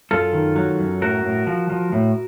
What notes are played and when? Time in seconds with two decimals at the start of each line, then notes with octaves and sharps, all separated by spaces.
0.11 F#2 F4 A4
0.33 D#3
0.56 F#3
0.79 F#2
1.01 A2 F#4 A#4
1.24 A2
1.47 F3
1.70 F3
1.92 A2